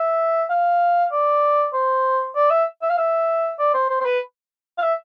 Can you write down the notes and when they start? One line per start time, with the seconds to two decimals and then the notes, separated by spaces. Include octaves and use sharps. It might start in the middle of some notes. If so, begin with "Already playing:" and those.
Already playing: E5
0.50 F5
1.12 D5
1.73 C5
2.36 D5
2.51 E5
2.82 E5
2.89 F5
2.98 E5
3.59 D5
3.74 C5
3.90 C5
4.01 C5
4.06 B4
4.78 F5
4.82 E5